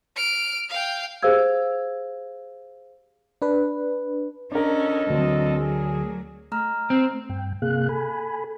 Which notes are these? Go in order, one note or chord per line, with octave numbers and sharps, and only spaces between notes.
F6 D7
F5 G5
G4 G#4 C5 F5 E6 G#6
D4 B4
F2 C#4 D4 A4 A#4 D#5
D2 F#3 C4
F#3 G#4
A3 A#5 F6
C4
G2 G5
C3 A#3 G#4 F5 F#6
A4 G#5 B5